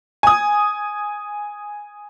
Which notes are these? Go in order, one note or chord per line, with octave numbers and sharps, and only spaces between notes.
G#5 D#6